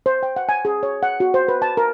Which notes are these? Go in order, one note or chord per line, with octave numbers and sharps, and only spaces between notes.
C5
G5
F#5
G#5
G#4
C#5
F#5
F#4
C5
B4
A5
A#4